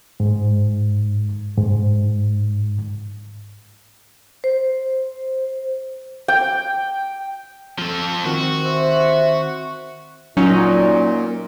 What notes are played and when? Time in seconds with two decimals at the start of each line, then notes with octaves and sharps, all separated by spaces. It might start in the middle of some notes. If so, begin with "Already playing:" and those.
0.20 G#2
1.58 G#2
4.44 C5
6.28 G5
7.79 F3 A4
8.25 D#3 C4 F#4
8.65 C5 E5
10.37 A#2 F#3 C#4 D#4